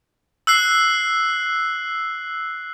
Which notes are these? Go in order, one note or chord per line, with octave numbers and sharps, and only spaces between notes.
E6 F#6 C7